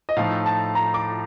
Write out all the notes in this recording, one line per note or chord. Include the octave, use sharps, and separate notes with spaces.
D#5
A2 F3 A3 D#4 F5
A5
A#5
D6